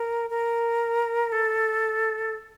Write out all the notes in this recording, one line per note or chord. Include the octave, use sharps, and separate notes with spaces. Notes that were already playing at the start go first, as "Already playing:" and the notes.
Already playing: A#4
A#4
A4